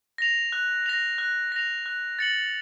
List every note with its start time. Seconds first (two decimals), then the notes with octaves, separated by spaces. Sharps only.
0.18 A#6 F7
0.52 F#6
0.86 A#6 F7
1.18 F#6
1.52 A#6 F7
1.86 F#6
2.19 A6 C#7 F#7